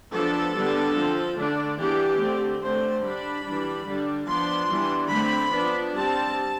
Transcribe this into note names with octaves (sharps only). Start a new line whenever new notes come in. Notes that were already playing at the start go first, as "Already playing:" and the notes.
F3 B3 D4 A4
D3 G3 B3 D4
F3 C4
D3 A3 D4
E3 B3 D4 G4
D3 A3 C4
D3 A3 C4 C5
G3 D4 B5
E3 G3 D4
D3 G3 D4
F3 B3 D4 C6
E3 G3 B3 D4
D3 A3 C4 B5
F3 B3 D4
G3 C4 A5